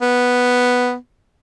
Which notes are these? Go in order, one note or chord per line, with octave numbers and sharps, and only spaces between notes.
B3